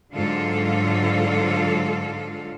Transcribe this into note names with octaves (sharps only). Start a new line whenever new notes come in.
G#2 D3 F#3 F4 A4 F5